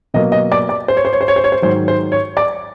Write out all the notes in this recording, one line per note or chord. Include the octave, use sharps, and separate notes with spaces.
B2 F#3 A#3 D#5
D#5
D5
D5
C5
C#5
C5
C#5
C5
C#5
C5
C#5
C5
G#2 D#3 F#3 C5
C5
C#5
D5